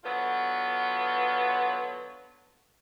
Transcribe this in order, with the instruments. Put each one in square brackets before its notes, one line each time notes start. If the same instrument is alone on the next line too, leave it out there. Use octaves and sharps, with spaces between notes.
[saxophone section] D3 F#3 B3 F4